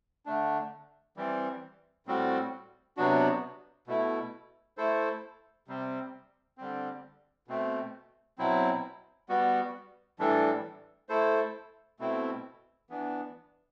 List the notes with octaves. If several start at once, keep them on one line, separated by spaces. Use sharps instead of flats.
D3 A3 D4
E3 G3 C4
A2 G3 C4 F#4
C3 F#3 B3 D4 F#4
B2 A3 E4
A3 E4 A4 C5
C3 G3 C4
D3 G3 C4
B2 A3 C4
B2 F#3 C4 E4
G3 B3 F#4
A2 E3 G3 D4 A4
A3 E4 A4 C5
B2 A3 C4 E4
E3 B3 D4